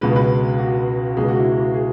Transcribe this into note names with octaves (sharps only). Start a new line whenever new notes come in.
C#2 B2 G#3 B4
B4
F#4
C#2 B2 G#3 G#4
F#4
E4
F#4
G#4